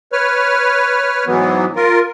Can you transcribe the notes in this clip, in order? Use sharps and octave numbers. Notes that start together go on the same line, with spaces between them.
B4 C#5 F6
G#2 E3 F#3 B3
F4 A#4